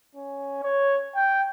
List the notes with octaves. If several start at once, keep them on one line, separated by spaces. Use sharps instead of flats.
C#4
C#5
G5